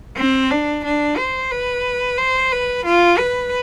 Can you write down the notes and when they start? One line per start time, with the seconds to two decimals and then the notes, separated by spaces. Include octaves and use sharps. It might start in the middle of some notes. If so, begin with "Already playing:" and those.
0.17 C4
0.51 D4
0.84 D4
1.17 C5
1.51 B4
2.17 C5
2.52 B4
2.85 F4
3.18 B4